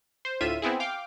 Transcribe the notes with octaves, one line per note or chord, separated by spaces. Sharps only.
C5
D2 A2 F4 E5 D#7
B3 C4 E4 G#4
F5 G5 D6